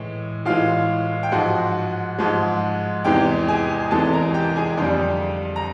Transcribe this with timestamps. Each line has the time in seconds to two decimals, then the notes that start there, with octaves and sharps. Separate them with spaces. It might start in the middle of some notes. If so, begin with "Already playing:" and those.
Already playing: A2 E3 G#3
0.45 A2 E3 G#3 F4 F5
1.23 G5
1.32 G#2 F3 G#3 F#4 F#5
2.19 G#2 F3 G#3
3.04 E2 C3 E3 G#3 G4 G5
3.48 G#4 G#5
3.91 E2 C3 E3 G#3 A4 A5
4.13 A#4 A#5
4.34 G4 G5
4.56 G#4 G#5
4.77 F2 D3 G3 G4 G5
5.56 A#5